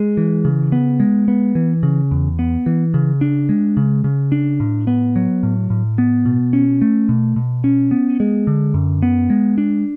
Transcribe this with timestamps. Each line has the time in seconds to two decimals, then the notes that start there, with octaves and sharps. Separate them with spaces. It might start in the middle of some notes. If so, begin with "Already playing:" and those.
Already playing: G#3
0.17 E3
0.45 C#3
0.72 B3
1.00 G#3
1.28 B3
1.55 E3
1.83 C#3
2.11 E2
2.39 B3
2.66 E3
2.94 C#3
3.21 D4
3.49 G#3
3.77 C#3
4.04 C#3
4.32 D4
4.60 A2
4.87 B3
5.16 F#3
5.43 A2
5.70 A2
5.98 B3
6.25 B2
6.53 C#4
6.82 A3
7.09 B2
7.36 B2
7.64 C#4
7.91 B3
8.20 G#3
8.47 D3
8.74 F#2
9.02 B3
9.30 G#3
9.58 D4